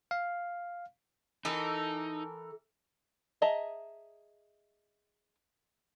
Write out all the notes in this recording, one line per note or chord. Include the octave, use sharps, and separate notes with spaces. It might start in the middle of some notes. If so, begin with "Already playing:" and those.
F5
E3 D#4 A4 A#4
G#4 D#5 E5 A5 A#5